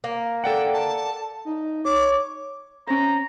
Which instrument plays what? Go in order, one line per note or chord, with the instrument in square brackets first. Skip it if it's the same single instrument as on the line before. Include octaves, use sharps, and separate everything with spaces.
[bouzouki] A#3
[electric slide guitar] A4 D5 F#5 [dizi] G5
[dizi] A5
[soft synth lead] D#4
[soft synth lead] C#5 [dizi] D6
[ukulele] C#4 C5 [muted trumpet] A#5